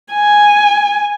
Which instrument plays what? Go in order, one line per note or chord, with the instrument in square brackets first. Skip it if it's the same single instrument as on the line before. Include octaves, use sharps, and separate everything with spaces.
[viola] G#5